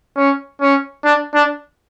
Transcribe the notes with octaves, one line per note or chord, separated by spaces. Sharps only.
C#4
C#4
D4
D4